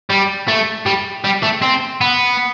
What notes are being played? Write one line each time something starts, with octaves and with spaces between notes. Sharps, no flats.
G3
A3
G3
G3
A3
C4
B3